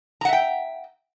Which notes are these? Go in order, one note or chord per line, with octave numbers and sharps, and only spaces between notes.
E5 F#5 G5 A#5